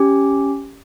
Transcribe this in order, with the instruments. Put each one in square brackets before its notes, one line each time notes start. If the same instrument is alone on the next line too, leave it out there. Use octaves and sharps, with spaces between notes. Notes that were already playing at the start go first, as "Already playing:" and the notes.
Already playing: [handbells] C#4 G4